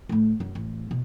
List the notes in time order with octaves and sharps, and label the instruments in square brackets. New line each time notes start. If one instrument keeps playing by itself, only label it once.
[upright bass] A2 A3
F#2
A1
B2